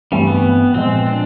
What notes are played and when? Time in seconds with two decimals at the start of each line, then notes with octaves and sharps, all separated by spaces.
0.12 G2 E3 G3 A3 C4
0.27 B3
0.74 A#2 F3 G#3 C4
1.06 D4